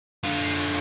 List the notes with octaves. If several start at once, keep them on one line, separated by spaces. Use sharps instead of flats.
D3 F4